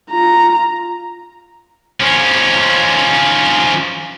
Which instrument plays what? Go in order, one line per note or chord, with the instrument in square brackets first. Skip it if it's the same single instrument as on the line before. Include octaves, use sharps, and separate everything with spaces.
[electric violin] F4 A#5
[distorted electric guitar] F3 C#4